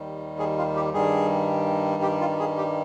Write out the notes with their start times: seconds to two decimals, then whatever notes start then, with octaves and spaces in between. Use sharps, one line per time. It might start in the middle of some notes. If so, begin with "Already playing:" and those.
Already playing: D#2 D#3 G3
0.39 G#4
0.58 F4
0.76 G4
0.94 G2 D#3 G3 G#4
2.02 G4
2.20 F4
2.40 G#4
2.58 G4